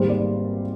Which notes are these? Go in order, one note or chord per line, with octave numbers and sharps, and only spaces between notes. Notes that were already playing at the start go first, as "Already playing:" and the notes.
Already playing: G#1 G#2 G3 A#3 C5
D5